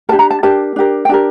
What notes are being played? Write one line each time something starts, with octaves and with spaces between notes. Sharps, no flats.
D4 G4 A#4 A5
A#5
A5
D4 G4 A#4 A5
D4 G4 A#4
G5
D4 G4 A#4 A5